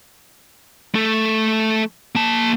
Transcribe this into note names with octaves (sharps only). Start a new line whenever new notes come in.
A3 A4
A#3 A5